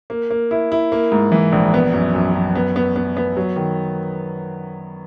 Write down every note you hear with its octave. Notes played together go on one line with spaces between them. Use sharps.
A#3
A#3
E4
E4
A#3
G#2
E3
A#1
B3
F#2
F#2
F#2
B3
B3
B3
B3
F#3
D#3